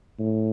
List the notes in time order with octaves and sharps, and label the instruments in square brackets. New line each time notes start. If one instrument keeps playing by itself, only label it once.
[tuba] A2